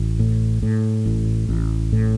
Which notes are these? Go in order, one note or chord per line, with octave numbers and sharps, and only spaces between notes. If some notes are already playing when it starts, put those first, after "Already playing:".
Already playing: A1
A2
A2
A1
A1
A2